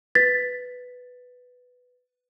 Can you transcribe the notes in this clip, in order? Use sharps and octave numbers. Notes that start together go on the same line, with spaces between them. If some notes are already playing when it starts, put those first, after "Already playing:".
B4 A6 B6